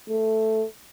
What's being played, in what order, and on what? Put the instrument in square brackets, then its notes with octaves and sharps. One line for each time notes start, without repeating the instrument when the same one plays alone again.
[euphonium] A3